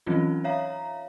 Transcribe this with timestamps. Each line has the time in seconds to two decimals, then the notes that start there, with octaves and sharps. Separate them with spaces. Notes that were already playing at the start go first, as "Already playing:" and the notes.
0.06 E3 F#3 C4 C#4 D#4 F4
0.44 C#5 E5 F5 A#5